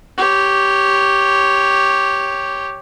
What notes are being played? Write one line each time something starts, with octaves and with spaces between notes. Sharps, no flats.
G4 C#5